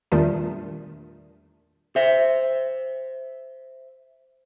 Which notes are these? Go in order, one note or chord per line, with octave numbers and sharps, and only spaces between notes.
E2 A#2 D#3 G3 A3 D4
C5 E5